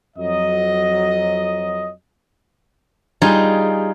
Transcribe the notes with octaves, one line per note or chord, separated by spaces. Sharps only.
F2 F#3 D#5
G3 D#4 F4 G#4